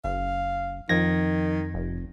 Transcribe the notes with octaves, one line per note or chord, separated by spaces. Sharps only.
F#1 F5
F2 D#3 F3 G#6 A#6
F1